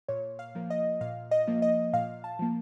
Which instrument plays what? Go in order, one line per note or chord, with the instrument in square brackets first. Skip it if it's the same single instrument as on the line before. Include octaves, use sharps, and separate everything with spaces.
[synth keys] A#2 C#5
F5
F3 A#3
D#5
A#2 F5
D#5
F3 A#3
D#5
A#2 F5
A5
F3 A#3